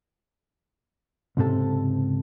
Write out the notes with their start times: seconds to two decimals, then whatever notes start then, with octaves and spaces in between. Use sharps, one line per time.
1.37 C#2 G#2 C3 A4